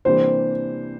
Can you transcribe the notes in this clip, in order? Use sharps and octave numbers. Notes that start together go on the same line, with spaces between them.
C3 E3 G3 A#3 D4 C5